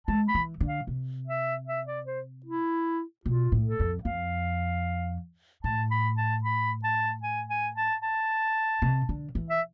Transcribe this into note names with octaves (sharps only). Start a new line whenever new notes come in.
G#3 A5
B5
E3
D3
F5
C3
E5
E5
D5
C5
E4
B2 F4
A2
A4
F2
F2 F5
A2 A5
B5
A5
B5
A5
G#5
G#5
A5
A5
C3
D3
E3
E5